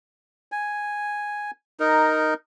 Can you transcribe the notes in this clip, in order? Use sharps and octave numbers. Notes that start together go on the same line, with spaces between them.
G#5
D#4 A#4